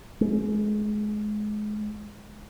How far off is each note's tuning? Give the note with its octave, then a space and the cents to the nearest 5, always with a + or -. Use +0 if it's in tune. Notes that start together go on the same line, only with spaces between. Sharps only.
G#3 +25